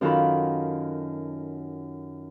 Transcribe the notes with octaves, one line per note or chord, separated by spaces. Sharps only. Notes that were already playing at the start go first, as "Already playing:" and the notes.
F#2 D#3 F4 F#4 A4 B5